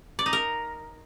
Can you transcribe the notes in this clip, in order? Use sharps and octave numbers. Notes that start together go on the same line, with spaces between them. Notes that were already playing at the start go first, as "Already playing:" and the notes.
D5
D#4
A#4